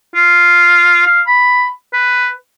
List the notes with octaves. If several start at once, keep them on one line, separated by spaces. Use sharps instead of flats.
F4
F5
B5
B4